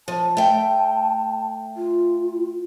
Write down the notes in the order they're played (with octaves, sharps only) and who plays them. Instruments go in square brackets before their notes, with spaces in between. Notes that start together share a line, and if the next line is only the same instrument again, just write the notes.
[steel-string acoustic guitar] F3 [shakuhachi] A5
[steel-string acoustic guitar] A3 G5
[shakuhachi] F4